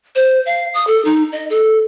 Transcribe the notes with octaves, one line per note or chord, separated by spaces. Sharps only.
C5
F5
D#6
A4
D#4
D#5
A4